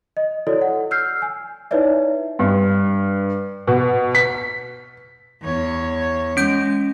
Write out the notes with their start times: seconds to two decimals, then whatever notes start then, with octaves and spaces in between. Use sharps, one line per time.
0.17 D#5
0.47 E4 F#4 A4 C#5 D5
0.62 F#5
0.91 E6 F6 G6 C7
1.22 G#5
1.71 D#4 E4 B4 C#5 D5 E5
2.39 G2
3.67 B2
4.15 B6
5.42 E2 C#5
6.37 G#3 C#4 G6 D7